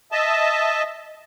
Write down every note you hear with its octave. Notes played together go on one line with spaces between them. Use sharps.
D#5 E5 A5